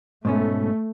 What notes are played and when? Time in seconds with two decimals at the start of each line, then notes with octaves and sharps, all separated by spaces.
0.25 G#2 B2 A3 C#4